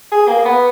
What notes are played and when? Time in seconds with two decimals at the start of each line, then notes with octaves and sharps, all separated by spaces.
0.12 G#4
0.28 A#3
0.45 B3